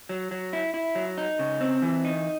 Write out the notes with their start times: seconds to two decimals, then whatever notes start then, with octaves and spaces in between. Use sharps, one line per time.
0.09 F#3
0.31 F#3
0.53 E4
0.74 E4
0.95 F#3
1.18 D#4
1.39 C#3
1.61 C4
1.82 E3
2.05 D#4